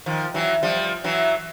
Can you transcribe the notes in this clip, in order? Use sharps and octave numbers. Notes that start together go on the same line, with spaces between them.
D#3 F3
E3 F#3
F3 G3
E3 F#3